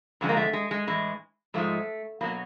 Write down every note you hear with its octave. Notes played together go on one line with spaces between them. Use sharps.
F2 D3 F3 G#3
A#3
A3
G#3
G#3
A2 E3 G#3
G#2 F3 G#3 A3
B2 F#3 A#3